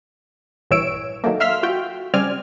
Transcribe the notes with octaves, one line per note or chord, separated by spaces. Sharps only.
A#1 G2 E3 C#5 E6 D7
D#3 F#3 A3 A#3
E5 F5 C6 E6 F6 B6
F4 F#4 G5
C#3 G3 C4 D5 G#5 F6